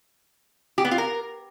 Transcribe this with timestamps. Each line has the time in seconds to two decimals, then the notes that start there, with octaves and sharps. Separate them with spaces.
0.78 G4
0.85 B3
0.91 F4
0.98 A#4